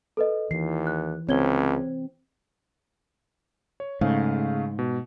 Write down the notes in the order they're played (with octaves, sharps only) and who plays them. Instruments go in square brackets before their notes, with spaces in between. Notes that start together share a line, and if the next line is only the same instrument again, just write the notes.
[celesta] A4 B4 D#5
[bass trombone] D#2 [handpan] E3 [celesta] C7
[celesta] F#6
[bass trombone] C#2 [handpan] C4 [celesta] C#5 G#6 G7
[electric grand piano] C#5
[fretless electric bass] G#2 [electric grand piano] C#3 A3 F5
[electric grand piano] B2